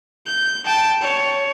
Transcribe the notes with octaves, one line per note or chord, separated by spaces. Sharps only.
G6
G5 A5
C#5